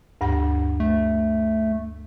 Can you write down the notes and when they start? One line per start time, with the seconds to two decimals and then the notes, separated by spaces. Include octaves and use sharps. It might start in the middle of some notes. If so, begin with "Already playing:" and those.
0.21 D2 G2 F#5
0.80 A3